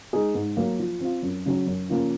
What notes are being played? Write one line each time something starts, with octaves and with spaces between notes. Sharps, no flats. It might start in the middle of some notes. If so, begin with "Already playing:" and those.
G#3 D#4 G#4
G#2
F#3 A#3
F3
C4 F4
F#2
C#3 F#3 C#4
F#2
C#3 F3 A#3 C#4